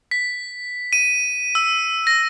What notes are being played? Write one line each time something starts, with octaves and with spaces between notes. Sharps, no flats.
B6
D#7
E6
A#6